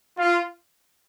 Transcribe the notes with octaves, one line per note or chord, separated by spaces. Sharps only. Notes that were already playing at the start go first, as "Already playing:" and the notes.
F4